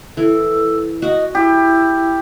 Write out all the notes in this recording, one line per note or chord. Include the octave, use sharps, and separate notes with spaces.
E3 A4
F#4 D#5 F#5
E4 G4